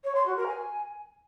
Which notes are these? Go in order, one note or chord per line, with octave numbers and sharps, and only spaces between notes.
C#5
C6
F#4
A#4
G#5